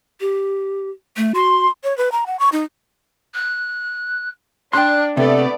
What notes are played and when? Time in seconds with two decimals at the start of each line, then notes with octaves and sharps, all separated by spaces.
0.20 G4
1.17 A3
1.34 F#4 C6
1.84 C#5
1.97 B4
2.12 A#5
2.27 F#5
2.39 C#6
2.52 D#4
3.35 F#6
4.73 D4 G5 C6 F#6
5.17 C3 A3 B3 A4 D5